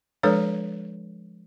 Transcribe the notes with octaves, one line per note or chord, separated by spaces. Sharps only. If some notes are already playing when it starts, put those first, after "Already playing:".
F3 G#3 D4 A4 B4 C#5